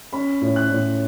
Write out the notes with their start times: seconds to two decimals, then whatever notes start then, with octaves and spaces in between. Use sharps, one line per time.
0.13 C#4 B5
0.41 A2
0.56 F#6
0.71 A2